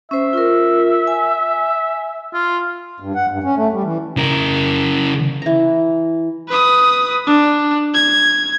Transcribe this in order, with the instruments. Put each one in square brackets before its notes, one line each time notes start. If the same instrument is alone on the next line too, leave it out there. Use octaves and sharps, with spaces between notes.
[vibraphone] C#4 C5 [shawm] E5
[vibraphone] F4 A#4
G#5
[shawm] F4
[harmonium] G2
F#5
G2
C#4
A3
G3
E3
[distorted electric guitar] C#3 A#4
[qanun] E3 A#5
[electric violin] B4 D#6
D4
G#6